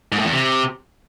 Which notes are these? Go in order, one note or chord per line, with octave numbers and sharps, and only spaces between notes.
G#2
A2
E2
C3